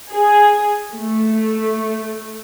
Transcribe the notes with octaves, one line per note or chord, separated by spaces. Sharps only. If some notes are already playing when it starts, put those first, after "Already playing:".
G#4
A3